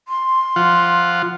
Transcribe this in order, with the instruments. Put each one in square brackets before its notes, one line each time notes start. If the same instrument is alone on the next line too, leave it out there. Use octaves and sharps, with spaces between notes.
[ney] C6
[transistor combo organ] F3 F4 F#5